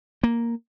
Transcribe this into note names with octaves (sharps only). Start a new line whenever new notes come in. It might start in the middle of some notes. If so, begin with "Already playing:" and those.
A#3